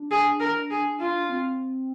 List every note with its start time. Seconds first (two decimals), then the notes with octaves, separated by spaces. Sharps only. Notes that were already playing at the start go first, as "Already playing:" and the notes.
Already playing: D4
0.11 G#4
0.40 A#4
0.70 G#4
0.99 F4
1.29 C4